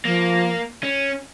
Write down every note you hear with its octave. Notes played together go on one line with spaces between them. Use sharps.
F3 A#3
C#4